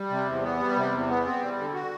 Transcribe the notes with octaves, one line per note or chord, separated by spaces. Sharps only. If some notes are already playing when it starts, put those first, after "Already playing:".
Already playing: G3
C3
E2
B3
G3
C3
E2
B3
C4
G3
D3
F#4